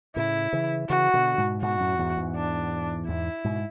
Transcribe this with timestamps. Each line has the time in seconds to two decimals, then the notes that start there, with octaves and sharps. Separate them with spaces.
0.16 A2 C#3 E4
0.53 C#3 E3
0.89 C#3 E3 F#4
1.14 B2 D3
1.38 G#2 B2
1.62 G#2 B2 F#4
1.80 F#2 A2
1.99 E2 G#2
2.17 E2 G#2
2.36 D4
3.08 E2 G#2 E4
3.44 G#2 B2